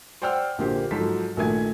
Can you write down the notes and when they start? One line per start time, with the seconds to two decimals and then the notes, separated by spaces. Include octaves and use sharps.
0.22 C5 D5 F#5 G5 E6 F6
0.58 A#1 D3 A#3 G4 C5
0.91 G#2 F3 F#3 A4 B6
1.37 A#1 D#3 A3 G#5 G#6